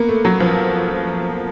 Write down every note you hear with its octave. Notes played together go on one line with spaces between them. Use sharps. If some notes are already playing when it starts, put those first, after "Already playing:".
Already playing: A#3 B3
A3
F#3
F3